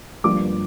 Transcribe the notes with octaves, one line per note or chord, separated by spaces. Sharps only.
G1 G2 F3 A#3 D6